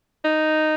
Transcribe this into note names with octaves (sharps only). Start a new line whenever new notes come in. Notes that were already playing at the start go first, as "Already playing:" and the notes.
D#4